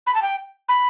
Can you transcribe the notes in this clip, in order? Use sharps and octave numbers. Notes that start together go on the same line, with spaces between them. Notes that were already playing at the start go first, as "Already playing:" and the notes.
B5
A5
G5
B5